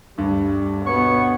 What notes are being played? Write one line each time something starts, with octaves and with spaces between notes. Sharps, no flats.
D2 G2 G3
B2 B3 C#5 C#6